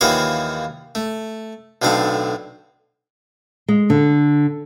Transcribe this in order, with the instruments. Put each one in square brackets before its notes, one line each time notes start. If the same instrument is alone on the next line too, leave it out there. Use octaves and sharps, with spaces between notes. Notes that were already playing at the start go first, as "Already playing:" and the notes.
[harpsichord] D#2 E3 F3 F#4 C#5 F5
A3
B1 A2 D3 A3 C4 F5
[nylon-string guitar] G#3
D3